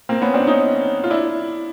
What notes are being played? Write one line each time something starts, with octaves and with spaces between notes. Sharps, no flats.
A#3 C4
B3 C#4
C4 D4
C#4 D#4
F4
D4 E4